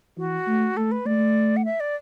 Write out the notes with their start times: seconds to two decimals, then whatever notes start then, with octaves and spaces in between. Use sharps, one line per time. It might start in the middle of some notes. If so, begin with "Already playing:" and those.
0.17 E3 F#4
0.47 A3
0.76 A3 A4
0.91 B4
1.06 A3 D5
1.57 F#5
1.65 E5
1.80 D5